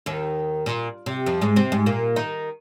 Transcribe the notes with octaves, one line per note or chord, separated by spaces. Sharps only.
D#2 D#3
A#2
C3
F2 F3
G#2 G#3
C3 C4
G#2 G#3
A#2 A#3
D#3 D#4